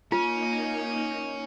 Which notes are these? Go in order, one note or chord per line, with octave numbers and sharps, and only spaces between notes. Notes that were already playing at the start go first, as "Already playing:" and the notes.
A#3 C#4 D#4 F4